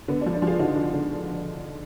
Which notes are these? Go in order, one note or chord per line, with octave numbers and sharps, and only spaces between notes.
D3 B3
D4
F3
D4
F3 F4 G#4
D3 D#4 F#4
D3
D3